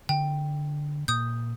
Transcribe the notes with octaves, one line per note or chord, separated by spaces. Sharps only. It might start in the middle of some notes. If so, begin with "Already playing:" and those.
D3 G5
A#2 D#6 G6